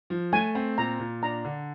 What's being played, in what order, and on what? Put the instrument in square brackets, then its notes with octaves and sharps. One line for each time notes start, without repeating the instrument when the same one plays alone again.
[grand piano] F3
[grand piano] A3 [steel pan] G#5
[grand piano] C4
[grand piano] A#2 [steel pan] A#5
[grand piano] A#2
[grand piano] D4 [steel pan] A#5
[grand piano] D3